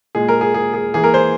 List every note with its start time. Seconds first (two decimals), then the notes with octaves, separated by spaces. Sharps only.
0.15 A#2 G#3 G#4
0.29 A#4
0.41 G#4
0.54 G#4
0.74 G#4
0.94 E3 A#3 G#4
1.04 A#4
1.14 C5